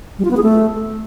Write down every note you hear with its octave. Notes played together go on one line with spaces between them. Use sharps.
G3
F4
B3
G#4
A3